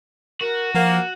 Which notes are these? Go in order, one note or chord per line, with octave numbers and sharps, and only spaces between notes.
F#4 A#4
F3 A#3 F#5